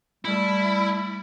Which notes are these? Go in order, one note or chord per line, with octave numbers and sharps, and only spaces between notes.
G3 A3 E4